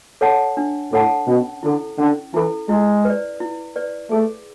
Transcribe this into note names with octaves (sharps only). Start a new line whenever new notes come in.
A4 C#5 F#5 A5
D4
A2 A4 C#5 F#5 A5
B2 C#4
D3 E4 A4
D3 C#4
E3 E4 A4
G#3 E4
B4
D5
E4
B4 D5
A3 G#4